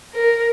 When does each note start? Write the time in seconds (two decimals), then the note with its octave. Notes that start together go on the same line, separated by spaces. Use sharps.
0.14 A#4